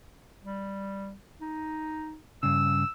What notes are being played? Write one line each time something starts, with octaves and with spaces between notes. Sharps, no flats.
G3
D#4
G2 C#3 E6